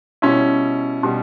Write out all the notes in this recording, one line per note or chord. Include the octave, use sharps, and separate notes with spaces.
B2 G3 C#4 E4
B2 G3